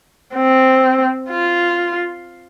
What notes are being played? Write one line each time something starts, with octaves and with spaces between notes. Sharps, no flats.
C4
F4